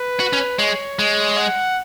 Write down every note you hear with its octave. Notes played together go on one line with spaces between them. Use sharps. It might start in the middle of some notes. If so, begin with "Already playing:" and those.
Already playing: B4
F#4
C#4
G#3 C#5
G#3
F#5